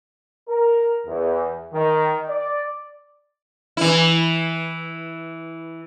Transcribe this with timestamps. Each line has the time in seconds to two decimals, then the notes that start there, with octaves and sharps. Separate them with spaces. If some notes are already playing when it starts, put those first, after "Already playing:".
0.48 A#4
1.07 E2
1.73 D#3
2.28 D5
3.77 E3 E4